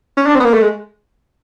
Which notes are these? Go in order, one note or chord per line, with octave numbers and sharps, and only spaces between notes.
C#4
D4
C4
B3
A#3
A3
G#3